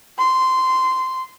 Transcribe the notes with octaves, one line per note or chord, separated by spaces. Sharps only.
C6